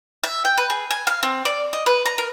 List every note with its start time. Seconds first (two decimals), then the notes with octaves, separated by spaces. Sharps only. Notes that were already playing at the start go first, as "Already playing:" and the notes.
0.23 E5
0.45 G5
0.58 B4
0.70 G#4
0.91 G#5
1.07 F5
1.23 C4
1.45 D5
1.73 D#5
1.86 B4
2.06 A#5
2.18 A#4